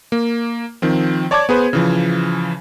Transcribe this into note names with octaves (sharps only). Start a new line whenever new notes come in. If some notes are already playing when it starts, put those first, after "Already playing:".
A#3
D#3 F3 C4
C#5 D5 A5 C#6 D6 G#6
B3 G#4 B4 C5
C#3 E3 F3